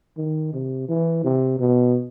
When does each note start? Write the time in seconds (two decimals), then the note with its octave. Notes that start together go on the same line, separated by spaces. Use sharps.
0.17 D#3
0.53 C3
0.89 E3
1.24 C3
1.59 B2